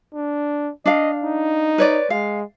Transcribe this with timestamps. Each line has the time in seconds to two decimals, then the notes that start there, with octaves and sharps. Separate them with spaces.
0.14 D4
0.86 D4 D#5 F5
1.24 D#4
1.78 B4 C#5 D5
2.10 G#3 F5